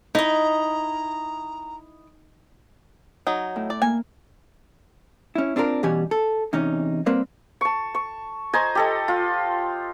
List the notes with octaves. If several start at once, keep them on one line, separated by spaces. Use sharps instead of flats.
D#4 E4 D#5 A#5
F#3 D#4
A2
D5
A#3 G#5
C#4 E4
C4 D4 F4 G#4 A#4
B2 E3 G3 C#4 G4 G#5
A4
E2 C3 C#4 D#4
G3 A#3 C4 A#4 B4
A5 C#6
C#6
C5 D#5 G#5 A#5
G4 A4 D#5
F4